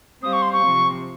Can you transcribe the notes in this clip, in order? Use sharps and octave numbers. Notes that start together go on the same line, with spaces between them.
G3 C4 G4 C5 F5 D#6
C#6
C6
C#6
C3 F3 C4